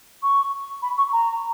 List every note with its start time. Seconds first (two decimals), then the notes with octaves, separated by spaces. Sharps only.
0.22 C#6
0.82 B5
0.97 C#6
1.12 A#5